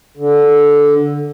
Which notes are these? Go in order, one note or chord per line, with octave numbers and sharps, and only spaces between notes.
D3